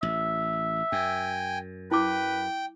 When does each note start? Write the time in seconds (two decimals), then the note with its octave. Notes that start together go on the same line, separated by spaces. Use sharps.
0.03 A1 E5
0.92 F#2 G5 G#5
1.91 E4 B4 G5 D6